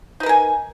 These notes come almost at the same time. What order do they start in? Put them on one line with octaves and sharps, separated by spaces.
D#4 B4 A#4 G#5